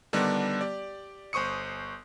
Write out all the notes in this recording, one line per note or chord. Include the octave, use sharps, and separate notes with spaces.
D3 D#3 G3 B3 D4
G4 D5
G1 C5 C#6 D#6 C#7